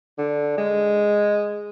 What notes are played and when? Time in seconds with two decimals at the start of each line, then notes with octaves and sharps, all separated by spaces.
0.18 D3
0.58 G#3